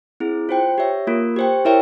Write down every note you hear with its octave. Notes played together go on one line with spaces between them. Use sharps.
C4 E4 G#4
F4 C5 G5
G4 C#5 E5
A#3 F4 A#4
G4 C5 G5
E4 A#4 C#5 E5 G5